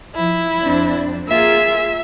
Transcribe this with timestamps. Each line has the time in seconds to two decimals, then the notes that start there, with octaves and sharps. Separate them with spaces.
0.15 F3 E4
0.61 F2 C4 D4
1.28 A#3 F4 G#4 E5